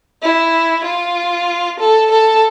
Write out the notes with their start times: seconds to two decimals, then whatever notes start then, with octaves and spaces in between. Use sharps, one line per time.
0.23 E4
0.85 F4
1.80 A4
2.11 A4